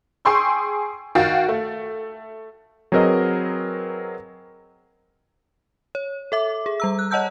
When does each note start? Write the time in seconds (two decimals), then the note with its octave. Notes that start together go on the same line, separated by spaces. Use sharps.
0.25 G#4 G5 C6 C#6 E6
1.15 D#3 F#4 F5 G5 A6
1.49 A3
2.92 F#3 C4 G#4 A#4 B4 D#5
5.95 C#5
6.32 A4 E5 D6
6.66 G#4
6.80 G3 A#5 E6
6.99 F#6
7.11 C#5 D#5 F#5 A5 E6 G6